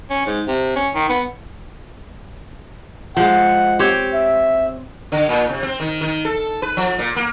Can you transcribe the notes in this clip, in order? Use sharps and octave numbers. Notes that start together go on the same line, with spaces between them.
C#4
G#2
C3
C#4
D#3
B3
F3 G#3 F#5
C4 G4 C#5
E5
D3
A#2
C3
C4
D#3
D#3
A4
B4
F3
A#2
A#3